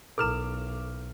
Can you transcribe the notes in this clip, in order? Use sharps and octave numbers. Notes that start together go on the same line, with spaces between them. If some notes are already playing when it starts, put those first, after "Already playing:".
B1 E4 A4 A#4 D6 F6 E7